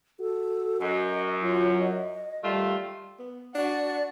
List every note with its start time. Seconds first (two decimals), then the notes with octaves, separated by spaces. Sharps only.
0.20 F#4 A4
0.82 F#2 D#5
1.42 F#3 F4
1.80 D#5
2.44 D#3 G3 A3 F4
3.19 B3
3.55 D4 F#4 D5